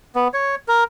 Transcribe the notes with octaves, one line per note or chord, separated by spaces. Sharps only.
B3
C#5
A#4